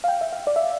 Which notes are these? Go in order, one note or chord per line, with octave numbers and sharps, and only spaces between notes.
F5
G5
E5
F5
D5
E5